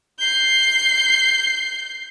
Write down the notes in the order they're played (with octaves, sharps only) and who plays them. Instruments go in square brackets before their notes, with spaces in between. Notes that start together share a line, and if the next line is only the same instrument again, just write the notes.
[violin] G6 C7